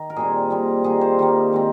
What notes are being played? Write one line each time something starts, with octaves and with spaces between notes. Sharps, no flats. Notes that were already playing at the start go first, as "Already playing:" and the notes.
Already playing: D#3
A#4
A#2 G3 C4 G#4
A#2 G3 C4
D#3 G3 A#3 G#4
C5
D#3 G3 A#3
D#3 G#3 C4